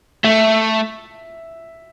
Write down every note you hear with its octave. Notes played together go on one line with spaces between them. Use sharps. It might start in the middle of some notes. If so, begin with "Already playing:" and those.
A3 E5